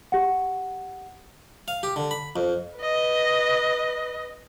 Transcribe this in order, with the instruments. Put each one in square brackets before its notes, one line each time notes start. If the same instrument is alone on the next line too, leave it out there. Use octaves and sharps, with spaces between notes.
[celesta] G4 F#5
[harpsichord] F5
G4
D3
B5
F2
[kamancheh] B4 D#5